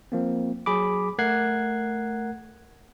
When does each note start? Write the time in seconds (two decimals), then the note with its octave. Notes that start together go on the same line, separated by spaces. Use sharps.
0.12 F3 A#3 C4
0.66 F#3 G#4 B5 D6
1.18 A3 A#4 F#5 F#6 G#6 C7